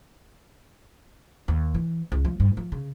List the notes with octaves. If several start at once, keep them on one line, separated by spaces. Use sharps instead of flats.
D#2
E3
C#2
F3
G2
F3
C#3